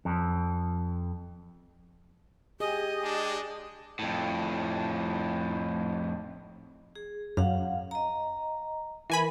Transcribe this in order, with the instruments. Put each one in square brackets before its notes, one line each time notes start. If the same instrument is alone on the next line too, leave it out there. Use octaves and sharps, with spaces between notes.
[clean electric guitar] F2
[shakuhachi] G4 [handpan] G#4 [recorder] D#5
[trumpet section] G#3 D4
[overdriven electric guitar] F2 A2
[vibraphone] G#4
[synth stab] F#2 [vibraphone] F5 F#5
[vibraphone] D#5 A#5
[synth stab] E3 G#5 B5 [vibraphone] A#4